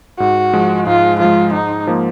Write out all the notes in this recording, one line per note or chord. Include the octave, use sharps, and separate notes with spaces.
G#2 F#4
F3 G#3
G#2 F4
F3 G#3 F4
G#2 D#4
F3 A#3